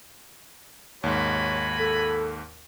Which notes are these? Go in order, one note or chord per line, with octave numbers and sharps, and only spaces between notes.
D#2 G#2 F#4 C#5 G#5 B5
A4